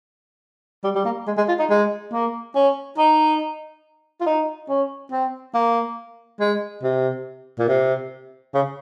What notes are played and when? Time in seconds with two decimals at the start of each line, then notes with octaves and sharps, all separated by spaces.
0.84 G3
0.95 G3
1.05 A#3
1.27 G#3
1.37 G#3
1.48 F4
1.59 D#4
1.70 G#3
2.13 A#3
2.55 C#4
2.98 D#4
4.21 F4
4.26 D#4
4.69 C#4
5.12 C4
5.54 A#3
6.40 G#3
6.83 C3
7.59 A#2
7.68 C3
8.54 C#3